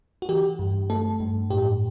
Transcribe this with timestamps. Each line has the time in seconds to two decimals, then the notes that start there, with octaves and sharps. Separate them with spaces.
0.22 F#4
0.29 E3 G4
0.59 G2
0.90 A3 A4
1.20 G2
1.50 A2 G4